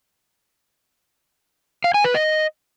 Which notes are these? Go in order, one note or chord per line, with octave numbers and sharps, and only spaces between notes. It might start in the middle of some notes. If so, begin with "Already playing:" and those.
F5
G#5
B4
D#5